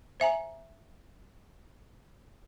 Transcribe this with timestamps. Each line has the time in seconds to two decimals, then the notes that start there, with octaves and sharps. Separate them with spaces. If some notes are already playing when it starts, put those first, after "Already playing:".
0.20 C5 E5 G#5 A#5